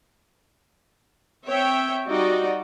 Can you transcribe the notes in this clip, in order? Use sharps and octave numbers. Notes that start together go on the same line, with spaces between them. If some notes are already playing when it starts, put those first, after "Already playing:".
C4 C#5 E5 G5
G3 D#4 F#4 D5 D#5